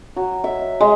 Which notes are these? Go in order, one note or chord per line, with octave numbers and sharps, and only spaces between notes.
F#3
E5
G#3